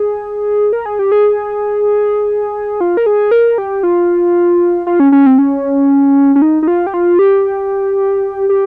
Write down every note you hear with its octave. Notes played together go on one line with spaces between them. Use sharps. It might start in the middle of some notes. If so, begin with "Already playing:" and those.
Already playing: G#4
A#4
G#4
G4
G#4
F4
A#4
G#4
A#4
G4
F4
F4
C#4
C#4
C4
C#4
C#4
D#4
D#4
F4
G4
F4
G4
G4